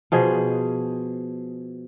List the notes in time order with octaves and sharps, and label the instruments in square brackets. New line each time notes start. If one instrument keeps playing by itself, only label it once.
[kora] B2 F3 G#4